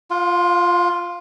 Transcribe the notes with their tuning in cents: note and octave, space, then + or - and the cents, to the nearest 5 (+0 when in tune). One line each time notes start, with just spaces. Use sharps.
F4 +0 F5 +40